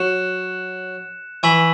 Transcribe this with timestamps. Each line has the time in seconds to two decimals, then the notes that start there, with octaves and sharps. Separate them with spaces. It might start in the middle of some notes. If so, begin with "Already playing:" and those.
Already playing: F#3 F#6 C#7 E7
1.43 E3 G#5 C#6 E6 B6 F#7